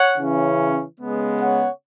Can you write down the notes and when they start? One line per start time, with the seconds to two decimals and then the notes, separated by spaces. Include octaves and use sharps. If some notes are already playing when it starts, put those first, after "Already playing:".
Already playing: C#5 F#5
0.17 C#3 E3 C#4
1.01 C#3 G#3 B3
1.41 C#5 F#5